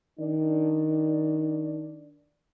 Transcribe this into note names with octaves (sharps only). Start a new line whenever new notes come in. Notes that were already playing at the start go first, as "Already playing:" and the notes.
D#3 D4 D5